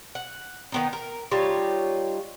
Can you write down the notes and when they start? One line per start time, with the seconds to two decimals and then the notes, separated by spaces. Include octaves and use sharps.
0.15 F#5
0.72 D#3 B3 D#4
0.93 A#4
1.31 G3 D#4 F4 C#5